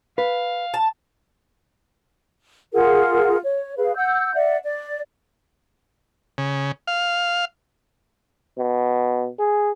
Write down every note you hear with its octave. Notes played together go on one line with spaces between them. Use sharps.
B4 F5
A5
F4 G#4 A#4 F#5
C#5
G#4 B4 F5
F#5 E6 G6
D5 E5 F#5
D5
C#3
F5
B2
G#4